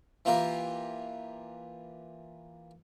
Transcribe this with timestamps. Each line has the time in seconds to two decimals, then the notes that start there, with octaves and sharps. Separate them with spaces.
0.25 E3 A#3 F4 G4 A#4